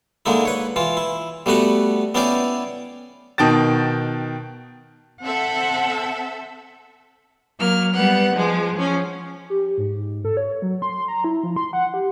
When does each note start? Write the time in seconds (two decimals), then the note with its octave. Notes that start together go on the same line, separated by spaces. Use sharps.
0.26 D3 G#3 A#3 D#4 E4
0.45 B4 C#5
0.76 E3 F4
0.97 E4
1.46 G3 A3 B3 F#4 B4
2.15 B3 C#4 E4 D5 F5 G5
3.38 B2 D#3 G5 A5 A6
5.23 C4 A4 E5 F#5
7.59 F#3 A#3 F6
7.95 G3 B3 F#5
8.33 F3 G#3
8.74 F3 C#4
9.50 G4
9.78 G#2
10.25 A4
10.37 C#5
10.62 F#3
10.82 C6
11.08 A#5
11.24 E4
11.43 F3
11.56 C6
11.73 F#5
11.94 G4